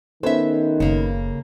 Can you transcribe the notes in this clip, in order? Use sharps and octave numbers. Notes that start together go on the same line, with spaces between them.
D#3 B3 C#4 A4 C5 E5
F#1 C#3 A#3